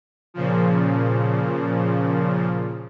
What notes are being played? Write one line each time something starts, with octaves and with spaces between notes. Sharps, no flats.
A#2 C#3 F3